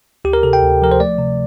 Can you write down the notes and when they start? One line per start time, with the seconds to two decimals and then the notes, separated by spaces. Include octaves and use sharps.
0.25 D2 G4
0.33 A#4
0.43 C3 A4
0.53 G5
0.62 D2
0.82 F3 A#4
0.92 C5
1.00 A3 D5
1.18 C3